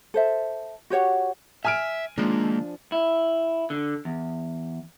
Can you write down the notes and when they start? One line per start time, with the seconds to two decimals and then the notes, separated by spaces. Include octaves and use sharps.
0.14 A4 C5 E5
0.90 F#4 G4 C#5 F#5
1.65 E5 G#5 F6 D7
2.18 D#3 F3 G#3 A#3 D4
2.92 E4
3.70 D3
4.05 E2